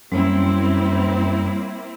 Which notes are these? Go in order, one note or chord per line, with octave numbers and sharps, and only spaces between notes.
F#2 G3 A#3 C4 E4 C#5